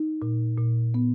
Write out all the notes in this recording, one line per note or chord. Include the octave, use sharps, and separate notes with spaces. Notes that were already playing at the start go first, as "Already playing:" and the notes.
Already playing: D#4
A#2
A#2
B3